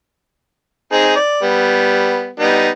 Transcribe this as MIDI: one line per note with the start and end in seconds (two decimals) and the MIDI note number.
0.92 1.15 60
0.92 1.15 63
0.92 1.15 68
1.16 1.41 74
1.42 2.30 55
1.42 2.30 59
2.40 2.69 55
2.40 2.69 59
2.40 2.69 63